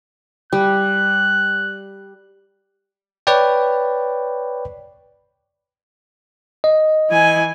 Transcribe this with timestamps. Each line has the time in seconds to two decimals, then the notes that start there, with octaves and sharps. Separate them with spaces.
0.52 G3 F#6
3.27 B4 C#5 D5 G5
6.64 D#5
7.10 E3 G#5